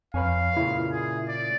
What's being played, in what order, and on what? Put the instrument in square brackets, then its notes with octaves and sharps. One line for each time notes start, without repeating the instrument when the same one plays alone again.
[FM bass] F2 [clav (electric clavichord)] B4 C#5 G#5 [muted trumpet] F5
[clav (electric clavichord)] A#2 C#3 [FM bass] E4
[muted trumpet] G#4
D5